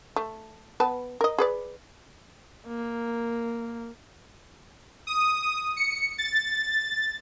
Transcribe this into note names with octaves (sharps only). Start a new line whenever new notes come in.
A3
B3 B4 A5
A#4 D#5
G#4 B4 D5
A#3
D#6
C#7
A6